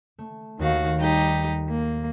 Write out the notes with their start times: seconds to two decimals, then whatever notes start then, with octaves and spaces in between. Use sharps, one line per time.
0.18 A3
0.59 D#2 D#3 F#4 F5
0.99 G3 D#4 G4
1.70 A#3